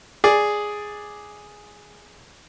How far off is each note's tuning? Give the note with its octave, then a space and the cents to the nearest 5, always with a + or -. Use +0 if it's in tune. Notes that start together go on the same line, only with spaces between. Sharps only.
G#4 +0 D5 +0